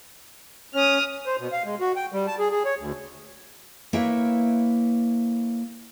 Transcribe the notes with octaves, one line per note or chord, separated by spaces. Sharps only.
C#4 D#6 F6
C5
B2
F5
G#3
F#4
G5
G3
A5
G#4
G#4
C#5
D2
A#3 E4 B4 C#5 E5 G5